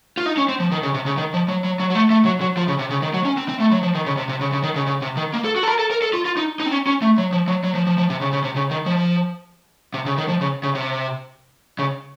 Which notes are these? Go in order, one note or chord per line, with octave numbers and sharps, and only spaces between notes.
F4
D#4
C#4
C4
F3
D#3
C#3
C3
C#3
D#3
F3
F#3
F#3
F#3
F#3
A3
A3
F#3
F#3
F3
C#3
C3
C#3
D#3
F#3
C#4
C4
C4
A3
F#3
F3
D#3
C#3
C3
C3
C#3
C#3
D#3
C#3
C#3
C3
D#3
A#3
A4
F#4
A4
A#4
A4
A#4
A4
F4
F4
D#4
D#4
C4
C#4
C#4
A3
F#3
F3
F#3
F#3
F3
F3
F3
C3
C#3
C#3
C3
C#3
D#3
F3
C3
C#3
D#3
F3
C#3
C#3
C3
C#3